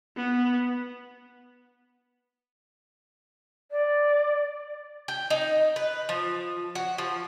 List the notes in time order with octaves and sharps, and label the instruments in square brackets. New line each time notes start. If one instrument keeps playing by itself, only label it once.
[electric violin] B3
[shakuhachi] D5
[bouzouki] G5
D#4
B4
F3
F#4
F3